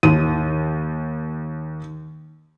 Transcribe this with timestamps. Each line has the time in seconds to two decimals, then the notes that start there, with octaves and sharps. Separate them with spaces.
0.03 D#2 D#7